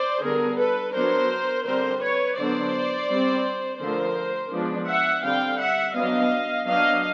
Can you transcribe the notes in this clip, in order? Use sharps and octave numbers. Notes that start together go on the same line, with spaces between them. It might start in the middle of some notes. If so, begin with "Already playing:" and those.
Already playing: C5 D5
D3 G3 B3 D4 G#4 A#4
A4 B4
F#3 B3 D4 A#4 C5
D3 G3 C4 A#4 C5
B4 C#5
D3 F#3 B3 D4 C5 D5
G3 C4
D3 F3 A3 A#4 C5
F3 G#3 B3 D4
E5 F#5
D3 G3 C4 F5 G5
E5 F#5
F#3 B3 D4 D#5 F5
F#3 B3 D4 D#5 F5